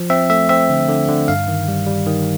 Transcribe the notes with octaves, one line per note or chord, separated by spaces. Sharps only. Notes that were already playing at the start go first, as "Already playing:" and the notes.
Already playing: F3
C4 E5
A3 E5
C4 E5
D3
D3
D3
G2 F5
D#3
G3
G3
D#3